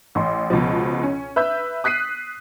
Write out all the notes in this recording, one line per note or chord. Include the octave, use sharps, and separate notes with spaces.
A1 C6
C#2 B2 F3
C#4
B4 E5 E6 G6
D#6 F#6 B6 C7 D#7